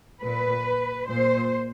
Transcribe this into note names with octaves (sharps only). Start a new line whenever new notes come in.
A#2 B4
A#2 C5